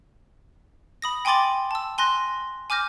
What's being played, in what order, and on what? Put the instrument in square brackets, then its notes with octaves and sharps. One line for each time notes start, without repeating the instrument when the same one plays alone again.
[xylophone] B5 D#6 A#6
G5 G#5 C6 D6 A6 F#7
A5 E6
G#5 C6 F#6 A#6
G#5 D6 F6 G6 A#6